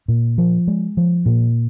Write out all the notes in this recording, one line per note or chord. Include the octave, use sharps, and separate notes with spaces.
A#2
F3
G#3
F3
A#2